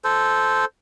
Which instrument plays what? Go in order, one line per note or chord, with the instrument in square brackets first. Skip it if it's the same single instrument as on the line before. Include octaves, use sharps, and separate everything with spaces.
[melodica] A4 C5